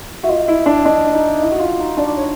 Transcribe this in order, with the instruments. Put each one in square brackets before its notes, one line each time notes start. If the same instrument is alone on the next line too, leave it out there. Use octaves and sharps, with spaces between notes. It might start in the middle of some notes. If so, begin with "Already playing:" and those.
[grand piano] F#4 [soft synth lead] E5
[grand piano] F4 [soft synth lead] D#5
[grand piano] E4
D4
[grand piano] D4 [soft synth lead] D#5
[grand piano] D#4
E4
F#4
F4
D#4
[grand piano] D4 [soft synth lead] D5
[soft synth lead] C#5